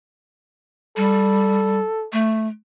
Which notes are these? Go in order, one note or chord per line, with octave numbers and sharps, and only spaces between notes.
G3 A4
A3